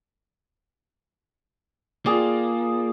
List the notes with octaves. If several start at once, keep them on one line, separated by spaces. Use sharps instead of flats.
A#3 F4 G#4 D5